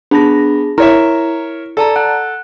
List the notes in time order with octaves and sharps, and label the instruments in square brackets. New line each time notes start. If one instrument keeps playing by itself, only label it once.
[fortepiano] B3 [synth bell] D4 A5 A#6 [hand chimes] G#4
[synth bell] E4 [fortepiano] A#4 C#5 E5 [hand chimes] A#5
[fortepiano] A4 [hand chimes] D5 A5 A#5
[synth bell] F#5 [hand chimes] F#6